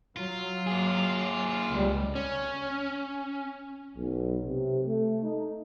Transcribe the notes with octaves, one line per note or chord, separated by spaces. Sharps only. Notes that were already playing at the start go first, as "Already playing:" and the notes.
F#3 F4
A#3 G#4
C#2 G3
C#4
B1
C3
A3
D#4